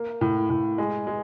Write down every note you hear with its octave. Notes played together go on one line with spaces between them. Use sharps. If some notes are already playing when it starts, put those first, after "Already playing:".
Already playing: A#3
A2
A2
G#3
G#3